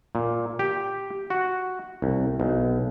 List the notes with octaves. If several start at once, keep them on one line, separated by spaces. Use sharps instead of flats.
A#2
G4
F#4
C2
B1